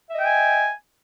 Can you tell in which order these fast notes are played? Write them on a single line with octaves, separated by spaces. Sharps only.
E5 D#5 G5 G#5